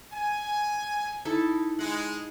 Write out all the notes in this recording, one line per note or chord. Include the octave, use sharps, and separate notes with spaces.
G#5
D#4 E4 A4
G#3 F#5